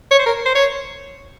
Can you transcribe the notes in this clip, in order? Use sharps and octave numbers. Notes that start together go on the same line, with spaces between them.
C#5
C5
A#4
C5
C#5